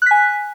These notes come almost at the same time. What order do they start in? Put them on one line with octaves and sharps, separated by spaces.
F#6 B6 G#5